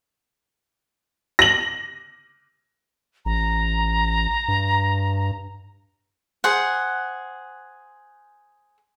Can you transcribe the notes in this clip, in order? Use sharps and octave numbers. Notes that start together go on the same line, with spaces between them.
A#6 F#7
A1 A#5
G2
G#4 C5 F#5